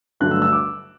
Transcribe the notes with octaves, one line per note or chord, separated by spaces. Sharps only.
G2 D3 F#3 A3 F#6
E6
E6
D6